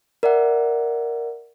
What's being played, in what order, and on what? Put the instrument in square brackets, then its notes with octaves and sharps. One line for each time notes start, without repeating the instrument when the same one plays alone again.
[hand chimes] A#4 D5 E5 F#5